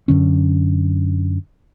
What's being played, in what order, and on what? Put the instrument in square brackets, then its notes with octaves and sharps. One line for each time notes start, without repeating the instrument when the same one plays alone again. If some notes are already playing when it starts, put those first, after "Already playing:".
[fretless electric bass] F#2 D3 C#4